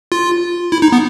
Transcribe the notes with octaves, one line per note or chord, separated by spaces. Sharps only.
F4
E4
D#4
B3